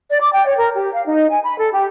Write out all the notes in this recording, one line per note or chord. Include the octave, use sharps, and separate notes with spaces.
D5
D6
G5
C#5
A#4
G4
F5
D#4
G#5
B5
A4
G4